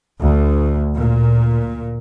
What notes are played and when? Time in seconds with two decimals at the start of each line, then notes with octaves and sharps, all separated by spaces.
0.20 D2
0.94 A#2